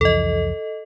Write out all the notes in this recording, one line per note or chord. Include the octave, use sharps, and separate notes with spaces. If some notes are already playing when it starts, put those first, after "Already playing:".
C2 F2 E3 A4 D#5